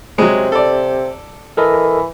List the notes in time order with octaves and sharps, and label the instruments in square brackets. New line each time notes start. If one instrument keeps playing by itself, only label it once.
[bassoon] C3 [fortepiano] F#3 G#3
[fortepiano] A4 D5
[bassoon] E3 [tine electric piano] A4 A#4 D#5